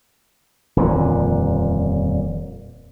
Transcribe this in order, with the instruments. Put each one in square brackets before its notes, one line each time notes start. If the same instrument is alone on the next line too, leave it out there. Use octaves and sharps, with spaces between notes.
[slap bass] D#1 F2 A#2 D3